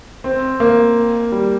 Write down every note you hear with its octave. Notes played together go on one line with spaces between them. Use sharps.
C4
A#3
G3